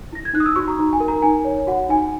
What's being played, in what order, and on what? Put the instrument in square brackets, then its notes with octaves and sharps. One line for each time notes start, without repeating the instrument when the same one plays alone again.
[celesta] E4 A#6
G#6
D#4 F#6
D#6
E6
F#4 C#6
A#5
D#4
G#5
A#4
A#5
D#4 G#5
C#5
F#4 F#5
D#4 G#5